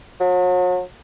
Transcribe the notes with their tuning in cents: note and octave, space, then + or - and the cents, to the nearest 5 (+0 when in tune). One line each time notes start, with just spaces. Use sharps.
F#3 -40